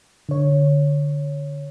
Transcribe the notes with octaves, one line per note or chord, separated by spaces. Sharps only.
D3 C#5